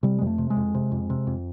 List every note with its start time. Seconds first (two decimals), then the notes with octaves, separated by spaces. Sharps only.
0.03 C3 G3
0.19 G#3
0.22 F2
0.27 A3
0.38 C3
0.50 G#3
0.57 F2
0.74 C3
0.92 F2
1.10 C3
1.27 F2